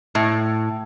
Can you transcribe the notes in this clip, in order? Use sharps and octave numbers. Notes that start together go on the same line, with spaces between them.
A2